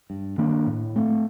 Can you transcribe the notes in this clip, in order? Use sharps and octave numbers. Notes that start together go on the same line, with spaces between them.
G2
D#3 A#3 D4
A2
A3 C4